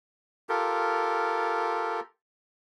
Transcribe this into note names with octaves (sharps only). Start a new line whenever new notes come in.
F4 G4 A4 A#4